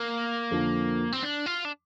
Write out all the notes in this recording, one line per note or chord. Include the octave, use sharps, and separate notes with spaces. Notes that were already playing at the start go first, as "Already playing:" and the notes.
Already playing: A#3
F2 D3 F3 D4
C4
D4
F4
D4